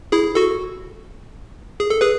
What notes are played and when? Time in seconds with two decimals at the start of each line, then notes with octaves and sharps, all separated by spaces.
0.12 E4 G#4
0.35 F#4 A4
1.80 G#4
1.90 A4
2.01 G#4 B4